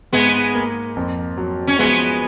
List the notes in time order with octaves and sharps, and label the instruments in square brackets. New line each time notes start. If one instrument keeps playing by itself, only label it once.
[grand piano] G#2 [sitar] G#3 B3
[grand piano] A#3
F2
F#3
[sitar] C#4
[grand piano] F3 [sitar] G#3 B3